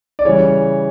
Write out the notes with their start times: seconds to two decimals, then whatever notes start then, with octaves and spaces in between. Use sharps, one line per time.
0.19 D5
0.25 C#3 E3 G3 C#5